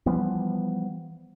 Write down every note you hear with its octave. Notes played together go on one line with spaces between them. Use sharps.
E3 F3 G3 B3